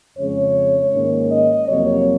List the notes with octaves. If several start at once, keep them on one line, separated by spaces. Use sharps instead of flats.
F2 C#3 G#3 C#4 C#5
G#2 D#3 A#3 C#4
D#5
F2 C3 F#3 A#3 C#5